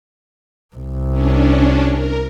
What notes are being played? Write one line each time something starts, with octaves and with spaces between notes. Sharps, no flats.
C2
C#4 D4
A#4